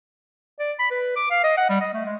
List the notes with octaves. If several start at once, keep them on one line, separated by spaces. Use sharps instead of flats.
D5
B5
B4
D6
F5
D#5
F#5
G3
D#5
A3
G#3